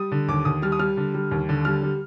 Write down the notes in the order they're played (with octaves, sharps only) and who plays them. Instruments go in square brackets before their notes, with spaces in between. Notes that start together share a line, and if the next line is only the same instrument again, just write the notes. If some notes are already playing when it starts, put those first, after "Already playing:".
Already playing: [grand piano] G3 D#6
D3
D#2 D6
D#2 D#6
G3 F6
D#6
G3 F6
D3
G3
D#2
D3
G3 F6
G3